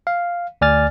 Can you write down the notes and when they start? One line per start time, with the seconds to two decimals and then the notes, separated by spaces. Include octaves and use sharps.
0.07 F5
0.61 D2 D5 G#5 F6 A6